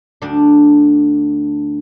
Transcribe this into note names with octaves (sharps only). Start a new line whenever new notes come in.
D2 D4